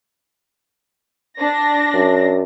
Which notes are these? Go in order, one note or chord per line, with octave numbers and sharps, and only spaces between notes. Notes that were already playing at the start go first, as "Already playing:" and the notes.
D4 A#6
F#2